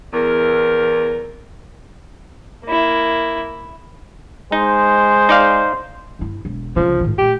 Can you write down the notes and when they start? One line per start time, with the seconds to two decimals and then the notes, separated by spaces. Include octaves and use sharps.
0.13 E2 A#4
2.65 A#3 E4
4.52 G#3 D#4 C5
5.29 D#4 D5 F5
6.19 G1 E4
6.45 E1
6.76 C2 C#3 F3
7.01 G#2 D#3
7.18 A#2 A3 G4